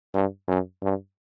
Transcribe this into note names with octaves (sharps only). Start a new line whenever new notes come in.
G2
F#2
G2